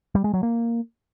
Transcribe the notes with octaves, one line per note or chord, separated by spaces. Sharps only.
G3
G#3
F#3
A#3